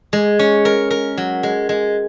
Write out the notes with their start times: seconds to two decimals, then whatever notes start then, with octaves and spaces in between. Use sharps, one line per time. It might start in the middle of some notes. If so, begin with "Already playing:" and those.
0.13 G#3
0.39 C#4
0.65 A#4
0.90 A#4
1.17 F#3
1.43 G#3
1.69 G#3